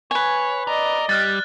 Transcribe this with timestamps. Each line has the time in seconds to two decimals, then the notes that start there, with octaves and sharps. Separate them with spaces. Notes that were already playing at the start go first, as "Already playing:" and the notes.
0.11 B4 C#5 G#5
0.67 A#4 D5 D#5
1.09 G3 F6 F#6 A6